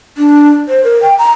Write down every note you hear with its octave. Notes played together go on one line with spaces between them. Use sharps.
D4
C5
A#4
G5
A#5